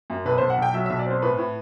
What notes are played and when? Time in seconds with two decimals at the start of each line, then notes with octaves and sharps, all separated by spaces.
0.10 F#2
0.25 B1 B4
0.38 B1 C5
0.50 F#5
0.58 B1 G5
0.74 F#3 E5
0.86 B1 E5
0.99 D5
1.06 C4 C5
1.22 A2 B4
1.38 A2